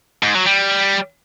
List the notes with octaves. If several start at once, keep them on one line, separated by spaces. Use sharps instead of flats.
G#2
F#3
G3